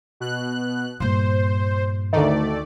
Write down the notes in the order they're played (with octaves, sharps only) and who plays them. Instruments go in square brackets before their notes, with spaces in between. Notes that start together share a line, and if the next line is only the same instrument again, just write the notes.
[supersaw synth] B2 F#6
[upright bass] G2 A#2 [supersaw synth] C5
[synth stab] D2 D#3 [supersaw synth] A3 D5